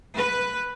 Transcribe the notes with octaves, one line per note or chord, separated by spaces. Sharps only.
B4